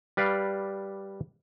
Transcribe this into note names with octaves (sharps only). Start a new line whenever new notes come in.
G3 B4 D5 F5